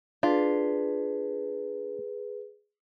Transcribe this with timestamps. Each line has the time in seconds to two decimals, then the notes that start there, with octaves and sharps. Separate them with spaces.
0.23 D4 F4 G#4 B4